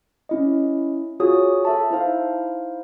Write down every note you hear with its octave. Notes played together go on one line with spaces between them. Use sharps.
C#4 E4 D#5
F4 F#4 G#4 C#5 D#6
A4 E5 A5
D#4 E4 C5 F5